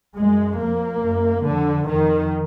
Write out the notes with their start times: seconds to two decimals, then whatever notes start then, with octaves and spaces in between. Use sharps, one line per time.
0.17 F#2 G#3
0.59 F2 A#3
1.02 F#2
1.44 F2 D3
1.87 F2 D#3